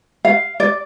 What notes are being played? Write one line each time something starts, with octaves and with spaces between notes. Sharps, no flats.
F5
D5